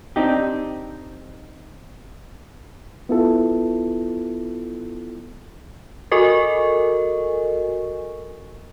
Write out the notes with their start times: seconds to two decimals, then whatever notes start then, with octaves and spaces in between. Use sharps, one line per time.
0.16 C4 D4 D#4 G4
3.09 B3 E4 F4 A4
6.11 F#4 A4 A#4 D#5 G#5 C#6